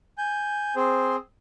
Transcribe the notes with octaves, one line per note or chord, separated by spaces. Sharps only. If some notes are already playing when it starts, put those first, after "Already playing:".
G#5 G6
C4 G#4 C5